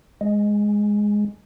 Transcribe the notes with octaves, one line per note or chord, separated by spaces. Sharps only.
G#3